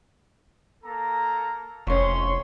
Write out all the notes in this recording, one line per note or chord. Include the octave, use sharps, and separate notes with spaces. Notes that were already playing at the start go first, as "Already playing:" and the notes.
A#3 A4 A#5
F1 F2 C#4 C6 C#6